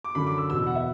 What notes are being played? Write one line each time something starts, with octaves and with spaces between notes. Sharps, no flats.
D6
F#2 D3 B5
D6
E6
E2 B2 E6
F#5
E5